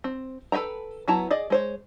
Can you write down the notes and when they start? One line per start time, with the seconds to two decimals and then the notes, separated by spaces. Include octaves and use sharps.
0.04 C4
0.52 A4 B4 E5 G5 A#5
1.08 F#3 B3 E4 A5 A#5
1.31 G#4 D5 D#5
1.50 G#3 C5 C#5